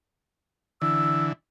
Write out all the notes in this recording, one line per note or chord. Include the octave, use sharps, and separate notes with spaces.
D3 E3 E6